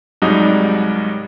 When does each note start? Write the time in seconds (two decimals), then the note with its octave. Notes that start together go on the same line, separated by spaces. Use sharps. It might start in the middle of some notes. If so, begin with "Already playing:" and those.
0.22 C2 G#2 F#3 G3 D#4